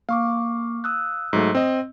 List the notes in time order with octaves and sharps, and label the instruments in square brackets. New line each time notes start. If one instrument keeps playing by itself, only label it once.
[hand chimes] A#3 C#6 D6 [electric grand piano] F5
[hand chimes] D#6 E6 F#6
[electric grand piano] G#2 F#3 A3
C4 D#5